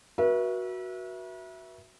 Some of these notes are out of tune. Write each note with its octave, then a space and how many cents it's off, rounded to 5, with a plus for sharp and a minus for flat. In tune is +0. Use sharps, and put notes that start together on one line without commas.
F#4 +0 B4 -40 E5 +0